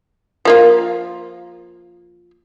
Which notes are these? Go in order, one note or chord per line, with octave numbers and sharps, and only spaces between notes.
F3 A#3 F4